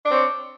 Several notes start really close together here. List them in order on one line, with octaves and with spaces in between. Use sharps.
D4 C4 C#5